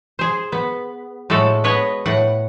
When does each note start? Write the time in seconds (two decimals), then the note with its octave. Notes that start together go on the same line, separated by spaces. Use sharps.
0.19 G#4 C5
0.52 B3
1.30 A2 G#3 F#4 A4
1.64 B3 B4 C#5 D#5
2.06 A2 F#5